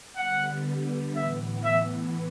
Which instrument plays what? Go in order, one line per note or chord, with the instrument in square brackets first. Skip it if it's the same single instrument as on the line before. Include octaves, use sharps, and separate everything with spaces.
[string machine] D3 G3 B3 [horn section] F#5
[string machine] A2 E3 B3 [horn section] E5
[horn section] E5